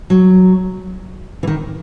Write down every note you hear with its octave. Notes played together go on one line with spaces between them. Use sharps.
F#3
E3
D#3